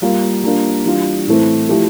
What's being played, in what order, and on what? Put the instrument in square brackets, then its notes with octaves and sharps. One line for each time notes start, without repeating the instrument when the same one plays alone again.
[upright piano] G3 A#3 F4
G3 A#3 D4 F4
E3 G3 D4 F4
A2 E3 A3 C4
F3 A3 E4 G4